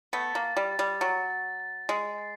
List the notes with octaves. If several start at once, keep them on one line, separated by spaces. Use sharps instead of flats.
A3 B3 A6
A#3
A6
G3
A6
G3
F#3 A6
A6
A6
G#3 C7
A6